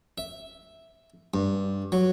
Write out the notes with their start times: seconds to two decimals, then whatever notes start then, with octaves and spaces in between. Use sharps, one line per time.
0.18 E5
1.34 G2
1.92 F#3